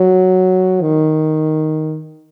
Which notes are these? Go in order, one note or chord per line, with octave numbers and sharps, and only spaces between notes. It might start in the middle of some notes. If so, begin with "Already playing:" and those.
Already playing: F#3
D#3